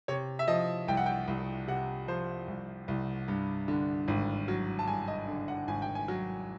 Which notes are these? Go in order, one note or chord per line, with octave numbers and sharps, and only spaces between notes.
C3 C#5
E5
F3 D#5
C2 G5
F#5
G5
C2
C3 F#5
F3 C5
C2
C2
G2
D3
G#1
F#3
A5
G2 G#5
D#5
D3
F#5
G#1 G#5
G5
G#5
F#3